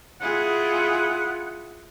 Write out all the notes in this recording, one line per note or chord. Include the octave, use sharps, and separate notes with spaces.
E4 F4 G#4 F#5